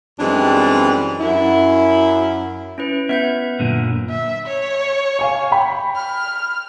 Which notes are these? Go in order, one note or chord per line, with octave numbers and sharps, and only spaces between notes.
F#2 E3 G3 G#3 C4 D4
F#2 E4
C#4 E4 B4
B3 B4 E5 G6
F#2 A#2 D3
E5
C#5
F5 G#5 C#6
G5 B5
F6